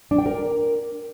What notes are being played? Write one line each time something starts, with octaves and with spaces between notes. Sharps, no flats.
D4
G5
A#4